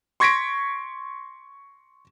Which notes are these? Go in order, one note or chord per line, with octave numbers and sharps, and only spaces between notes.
C6 C#6 G#6 A#6 B6 D7